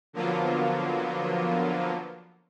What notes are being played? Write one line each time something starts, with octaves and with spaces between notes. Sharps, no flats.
D3 F3 F#3 A#3 B3 F4